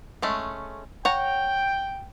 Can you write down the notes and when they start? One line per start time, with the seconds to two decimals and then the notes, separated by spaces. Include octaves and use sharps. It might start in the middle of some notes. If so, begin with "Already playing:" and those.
0.22 G#3 A3 C#4
1.05 C#5 F#5 G5 A#5